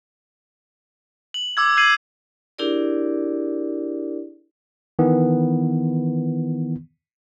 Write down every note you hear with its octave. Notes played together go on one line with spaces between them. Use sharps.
F#7
D6 E6 G#6
E6 G6 G#6 C7 D#7 F#7
D4 E4 G4 G#4 A#4 D5
D#3 E3 B3